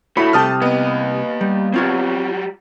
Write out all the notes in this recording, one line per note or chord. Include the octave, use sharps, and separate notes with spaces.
A3 E4 F#4 C#5 B5
C2 C3 G4 A5 D#6 F6
A#3 B3 D#5
G3
F#3 G3 C4 F4 C#5